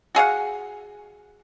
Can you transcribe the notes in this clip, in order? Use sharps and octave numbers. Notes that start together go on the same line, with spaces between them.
F#4 G#4 F5 F#5